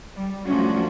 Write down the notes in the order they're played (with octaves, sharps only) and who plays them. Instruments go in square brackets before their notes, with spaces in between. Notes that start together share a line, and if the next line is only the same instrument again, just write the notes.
[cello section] G3
F3 G3 A3 C#4 D4 F#4